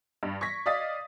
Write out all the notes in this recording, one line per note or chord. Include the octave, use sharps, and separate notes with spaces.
G2
C#6 G#6 A#6 B6
D5 D#5 F5 D#6 A6 B6